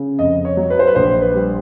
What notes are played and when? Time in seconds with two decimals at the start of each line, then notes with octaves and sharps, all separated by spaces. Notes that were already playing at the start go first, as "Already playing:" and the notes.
Already playing: C#3
0.19 F2 D#5
0.45 C#5
0.57 F#3
0.70 B4
0.79 C5
0.87 B4
0.95 A#1 C5
1.22 B4
1.34 G3